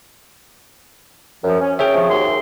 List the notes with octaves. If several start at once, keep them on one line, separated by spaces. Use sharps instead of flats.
F#2 F3
C#4
C#4 G#4 C#5 E5 G5
C3 F3 A3
D#2 F#4 C6